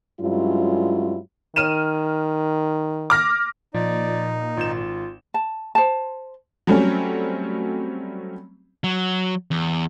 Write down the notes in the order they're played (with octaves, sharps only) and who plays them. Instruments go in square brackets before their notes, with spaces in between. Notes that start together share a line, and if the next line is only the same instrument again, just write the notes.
[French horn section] G2 F#3 G#3 C#4 E4 F4
[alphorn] D#3 [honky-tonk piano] F6 D#7 E7
[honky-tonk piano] D6 F6 A#6
[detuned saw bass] A#2 [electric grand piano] F3 [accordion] D#4 [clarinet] D5
[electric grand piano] G#1 G6 E7 [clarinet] F4
[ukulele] A5
C5 A5
[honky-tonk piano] F#3 G3 A3 C4 C#4
[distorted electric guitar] F#3
E2